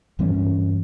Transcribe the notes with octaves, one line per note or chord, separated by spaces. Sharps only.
G2 E3 G3 C#4